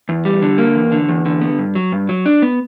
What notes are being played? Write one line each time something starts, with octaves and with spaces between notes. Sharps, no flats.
E2
G3
D3
A#3
E2
D3
E2
D3
B3
G2
F#3
G2
F#3
D4
B3